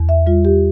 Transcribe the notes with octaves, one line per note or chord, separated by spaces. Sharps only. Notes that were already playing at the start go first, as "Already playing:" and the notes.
Already playing: E2
E5
G3 F4
G4